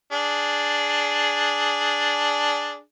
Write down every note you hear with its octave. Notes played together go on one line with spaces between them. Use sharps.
D4 G#4